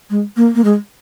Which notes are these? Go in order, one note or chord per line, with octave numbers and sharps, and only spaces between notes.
G#3
A#3
A#3
G#3